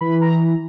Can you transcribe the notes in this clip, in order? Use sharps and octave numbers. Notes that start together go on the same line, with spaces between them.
E3 B5
A#5